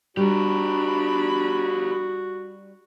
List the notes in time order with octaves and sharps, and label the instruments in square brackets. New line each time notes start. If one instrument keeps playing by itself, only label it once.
[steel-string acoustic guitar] G3 [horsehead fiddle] D4 B5 [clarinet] F#4 [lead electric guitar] G4 A#4